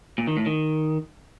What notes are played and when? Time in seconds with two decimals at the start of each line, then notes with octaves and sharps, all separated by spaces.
0.18 A#2
0.27 D#3
0.37 A2
0.46 D#3